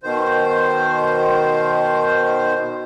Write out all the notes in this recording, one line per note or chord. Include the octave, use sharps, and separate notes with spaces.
B2 D#3 C5